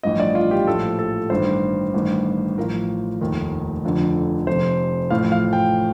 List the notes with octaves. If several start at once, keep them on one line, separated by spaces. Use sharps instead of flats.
A1 G2 F3 D#5
D5
F4
G4
A#1 A2 F3 A4
A4
A1 G2 D#3 C5
A1 G2 D#3
A1 A2 F3 A#4
F1 D#2 D#3
F1 F2 D3 F3
F1 F2 C3 C5
A1 A2 F3 F5
F5
G5